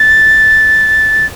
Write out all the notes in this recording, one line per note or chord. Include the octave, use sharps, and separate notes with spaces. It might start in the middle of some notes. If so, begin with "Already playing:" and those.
Already playing: A6